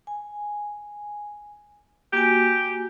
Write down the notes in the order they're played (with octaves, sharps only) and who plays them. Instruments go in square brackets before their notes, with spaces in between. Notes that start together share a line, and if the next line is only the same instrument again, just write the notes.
[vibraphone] G#5
[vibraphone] A#3 F#4 G#5 [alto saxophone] G4